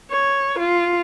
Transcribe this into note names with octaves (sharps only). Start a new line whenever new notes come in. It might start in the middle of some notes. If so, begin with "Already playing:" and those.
C#5
F4